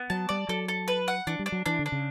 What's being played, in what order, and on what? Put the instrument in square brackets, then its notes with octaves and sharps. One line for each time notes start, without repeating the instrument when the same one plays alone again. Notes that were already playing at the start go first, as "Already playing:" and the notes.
Already playing: [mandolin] B3
[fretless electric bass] F#3 [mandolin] A5
[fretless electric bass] G3 [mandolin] D5
[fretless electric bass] F#3 [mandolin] A4
[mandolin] A4
B4
F#5
[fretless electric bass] E3 [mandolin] D4
[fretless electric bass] G3
[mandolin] D4
[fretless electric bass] F#3
[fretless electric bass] E3 [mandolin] D4
[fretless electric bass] D3
[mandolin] D4
[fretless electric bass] C#3